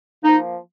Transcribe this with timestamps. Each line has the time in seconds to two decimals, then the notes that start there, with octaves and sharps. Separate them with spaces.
0.24 F3 A#3 D#4